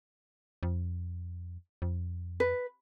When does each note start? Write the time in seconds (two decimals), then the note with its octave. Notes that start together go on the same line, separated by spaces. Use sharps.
0.63 F2
1.82 F2
2.40 B4